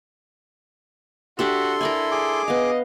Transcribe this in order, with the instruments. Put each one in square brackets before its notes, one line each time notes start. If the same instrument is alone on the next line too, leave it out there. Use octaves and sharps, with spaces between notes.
[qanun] D4 G4 E5 [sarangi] F#4 [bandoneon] A4 C6
[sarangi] E4 [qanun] A#4 D5 G#5
[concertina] G#4 D6
[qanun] B3 F5 [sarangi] D#5